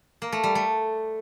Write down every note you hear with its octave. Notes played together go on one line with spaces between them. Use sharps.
A#3
A3
G3
A3